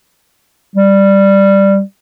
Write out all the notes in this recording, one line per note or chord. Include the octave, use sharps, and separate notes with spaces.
G3